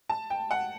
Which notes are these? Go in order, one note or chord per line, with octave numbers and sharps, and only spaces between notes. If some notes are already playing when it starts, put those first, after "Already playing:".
A5
G5
F#5